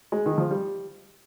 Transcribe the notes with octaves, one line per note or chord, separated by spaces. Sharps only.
G#3
D#3
F3
G3